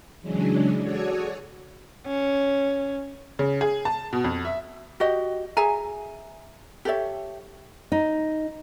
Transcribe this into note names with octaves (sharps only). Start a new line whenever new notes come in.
C#3 E3 F#3 G#3 C#4 D4
F#4 G#4 A4 C#5 D5 G#5
C#4
C#3
G#4
A5
B2
F2
E5
F#4 G4 D#5
G#4 E5 G#5 A#5
G4 A4 C#5 E5
D#4